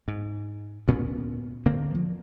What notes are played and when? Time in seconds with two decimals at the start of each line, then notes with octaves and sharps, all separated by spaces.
0.08 G#2
0.88 D2 A#2 B3 C#4
1.66 D3 A#3 C4
1.95 F3